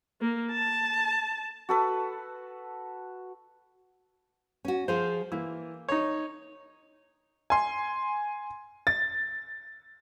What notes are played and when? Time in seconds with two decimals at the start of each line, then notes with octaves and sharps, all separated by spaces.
0.21 A#3
0.52 A5
1.69 F#4 A4 B4
4.65 C#4 F#4
4.88 F3 F4 G#4 C5
5.32 E3 A#3
5.89 D#4 C#5
7.50 G#5 C6
8.87 A6